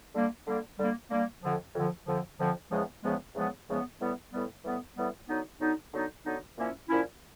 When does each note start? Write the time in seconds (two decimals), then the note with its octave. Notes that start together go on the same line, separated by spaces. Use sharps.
0.14 D3 G3 A#3
0.46 D3 G3 A#3
0.78 D3 G3 A#3
1.10 D3 G3 A#3
1.42 F2 D3 F3
1.74 F2 D3 F3
2.06 F2 D3 F3
2.38 F2 D3 F3
2.71 E2 C#3 F3 G#3 B3
3.03 E2 C#3 F3 G#3 B3
3.35 E2 C#3 F3 G#3 B3
3.67 E2 C#3 F3 G#3 B3
3.99 A2 E3 G3 B3
4.32 A2 E3 G3 B3
4.64 A2 E3 G3 B3
4.96 A2 E3 G3 B3
5.28 D3 F#3 B3 D#4
5.60 D3 F#3 B3 D#4
5.93 D3 F#3 B3 D#4
6.25 D3 F#3 B3 D#4
6.57 A#2 F3 A#3 C#4 E4
6.88 A#2 F3 A#3 C#4 E4